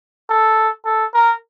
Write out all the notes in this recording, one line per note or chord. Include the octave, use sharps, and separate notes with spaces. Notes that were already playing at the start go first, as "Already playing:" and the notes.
A4
A4
A#4